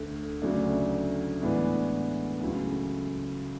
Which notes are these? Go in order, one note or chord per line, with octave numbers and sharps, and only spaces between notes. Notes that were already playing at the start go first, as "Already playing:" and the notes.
Already playing: D2 D3 A3
D2 C#3 F#3 A3 D4
A2 E3 G#3 B3 D4
C#2 C#3 F#3 A3 E4